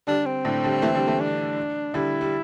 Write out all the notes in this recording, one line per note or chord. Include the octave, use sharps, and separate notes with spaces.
D3 G3 D4
C4
A2 D3
D3 G3
E3 A3
D3 G3
E3 A3
D4
D3 G3 E4
G3